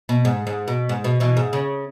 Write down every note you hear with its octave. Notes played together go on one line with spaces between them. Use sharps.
B2
G#2
G#2
B2
G#2
B2
B2 E3
G#2
C#3